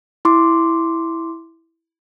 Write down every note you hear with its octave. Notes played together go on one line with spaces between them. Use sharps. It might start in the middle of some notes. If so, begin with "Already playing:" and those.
E4 C6 D6